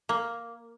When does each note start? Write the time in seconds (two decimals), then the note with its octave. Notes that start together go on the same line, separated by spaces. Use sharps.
0.09 A#3